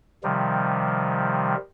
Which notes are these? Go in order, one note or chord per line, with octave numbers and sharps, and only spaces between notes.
C3 D#3 F3 G3